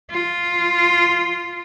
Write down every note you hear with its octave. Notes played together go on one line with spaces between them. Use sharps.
F4